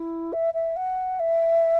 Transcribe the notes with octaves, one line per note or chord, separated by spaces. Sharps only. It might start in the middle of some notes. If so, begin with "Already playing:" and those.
Already playing: E4
E5
E5
F#5
E5